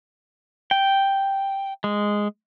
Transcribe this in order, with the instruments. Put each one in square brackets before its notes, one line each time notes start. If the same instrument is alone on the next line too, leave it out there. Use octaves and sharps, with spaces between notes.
[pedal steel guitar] G5
G#3